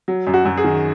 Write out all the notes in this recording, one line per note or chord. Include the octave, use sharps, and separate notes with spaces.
F#3
F#2
F#4
F#2
G#4
D#3